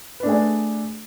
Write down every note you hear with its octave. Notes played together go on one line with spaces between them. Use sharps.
A3 D4 G#4 B4 D5